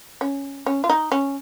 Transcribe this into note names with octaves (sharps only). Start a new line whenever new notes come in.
C#4
C#4
F4
D#4
C#4